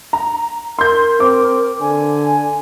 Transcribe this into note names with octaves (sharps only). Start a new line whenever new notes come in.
A#5
A#4 C6 G6
C4 D6
D3 G#5